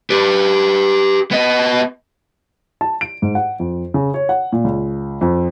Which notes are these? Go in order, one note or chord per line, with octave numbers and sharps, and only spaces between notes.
G4 B4
B3 D#5
A5
D7
G#2
F#5
F2
C#3
C#5
F#5
A#2
C#2
F2